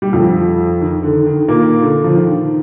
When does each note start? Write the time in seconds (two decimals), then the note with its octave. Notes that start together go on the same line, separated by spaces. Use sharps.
0.02 G3
0.13 F2 F3
0.81 D#3
1.03 D3
1.26 D#3
1.48 A#2 A#3
1.82 D3
2.04 F3
2.16 D#3